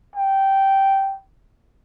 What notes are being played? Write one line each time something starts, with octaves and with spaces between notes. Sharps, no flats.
G5